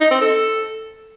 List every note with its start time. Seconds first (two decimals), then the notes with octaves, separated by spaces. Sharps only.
0.01 D#4
0.11 C4
0.21 A4